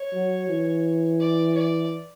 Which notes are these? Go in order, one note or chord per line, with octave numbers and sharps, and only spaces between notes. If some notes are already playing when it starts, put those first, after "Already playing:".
Already playing: C#5
F#3
E3
D5
D5